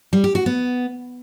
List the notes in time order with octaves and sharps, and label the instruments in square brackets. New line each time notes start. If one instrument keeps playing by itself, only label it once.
[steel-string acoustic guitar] G3
G4
F#4
B3